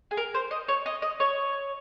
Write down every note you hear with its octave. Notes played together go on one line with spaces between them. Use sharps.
G#4
A#4
C5
D#5
C#5
D#5
D#5
C#5